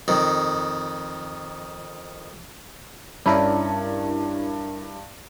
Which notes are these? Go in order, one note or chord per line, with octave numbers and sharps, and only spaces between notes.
F2 D#3
G2 C#4 D4 E4 A#4 D5 A5 B5